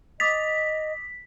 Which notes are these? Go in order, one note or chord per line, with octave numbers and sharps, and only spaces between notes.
D#5 D6 D#6 A6 B6